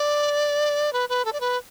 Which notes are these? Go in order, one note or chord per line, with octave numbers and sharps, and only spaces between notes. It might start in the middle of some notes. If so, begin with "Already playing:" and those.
Already playing: D5
B4
B4
A4
D5
B4